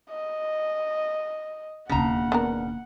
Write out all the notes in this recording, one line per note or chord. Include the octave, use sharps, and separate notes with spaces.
D#5
E1 D#2 C#3 F#5 A#5
B3 D4 A#4